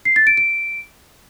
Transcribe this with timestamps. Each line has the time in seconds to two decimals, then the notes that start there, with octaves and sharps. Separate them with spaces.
0.05 C7
0.16 A6
0.27 D7
0.37 D7